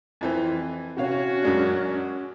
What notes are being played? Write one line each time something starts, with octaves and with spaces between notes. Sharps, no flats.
F2 E3 C4
C3 C#4 F#4 C#5 F5
F#2 G#3 D4